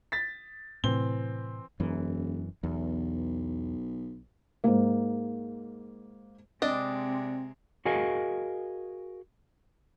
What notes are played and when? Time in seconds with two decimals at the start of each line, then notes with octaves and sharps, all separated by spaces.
0.12 A6 B6
0.84 A2 C3 E3 C4 G7
1.80 E1 F#2 E3
2.63 B1 E2
4.64 G#2 A#3
6.62 C3 G#3 C4 D4 D5 D#5
7.85 F#4 G#4 A#4 D#5 F5 G#5